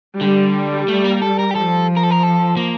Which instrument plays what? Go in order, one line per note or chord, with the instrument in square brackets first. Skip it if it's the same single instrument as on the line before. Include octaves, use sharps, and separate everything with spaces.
[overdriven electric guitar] D3 [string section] G3
[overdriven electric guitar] A3
A#3
A4
A#4
G4
[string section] F3 [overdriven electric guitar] A4
[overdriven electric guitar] A#4
A4
A#4
A4
A#3